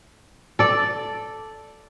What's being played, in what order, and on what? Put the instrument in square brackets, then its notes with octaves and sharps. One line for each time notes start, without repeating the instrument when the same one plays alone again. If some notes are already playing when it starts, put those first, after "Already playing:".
[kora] A4 D5